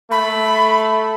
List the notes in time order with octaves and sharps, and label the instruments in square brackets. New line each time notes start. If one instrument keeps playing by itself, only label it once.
[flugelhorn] A3 [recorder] B5